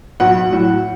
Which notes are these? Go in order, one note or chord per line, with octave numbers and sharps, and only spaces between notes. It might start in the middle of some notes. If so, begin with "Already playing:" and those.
B1 F#5
A2 F#3